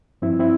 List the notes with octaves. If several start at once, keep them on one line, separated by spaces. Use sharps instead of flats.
G2 F3 C4 E4
C4 E4